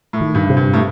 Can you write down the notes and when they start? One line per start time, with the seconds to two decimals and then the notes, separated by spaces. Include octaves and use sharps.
0.13 A2
0.21 D#3
0.35 G2
0.49 C3
0.57 G2
0.73 A2